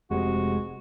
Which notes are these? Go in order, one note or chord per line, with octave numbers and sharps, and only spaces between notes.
F1 C3 G#3 F#4